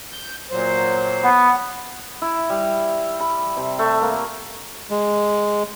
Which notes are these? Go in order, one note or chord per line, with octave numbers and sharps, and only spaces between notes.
G6
A#2 F#3 C5
B3 F#5
E4
G3
B5
C3
A3
A#3
G#3